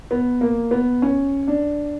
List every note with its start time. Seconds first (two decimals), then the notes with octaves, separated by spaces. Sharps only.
0.11 B3
0.41 A#3
0.71 B3
1.02 C#4
1.47 D4